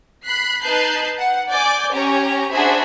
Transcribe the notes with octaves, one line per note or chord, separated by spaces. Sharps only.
B5 F#6 B6 C7
D#4 B4 A5 F#6 G6 C7
F#5
D5 G#5 D6 G6
C#4 G4 C#5 A#5
D4 F#4 G#4 C5 E5 B5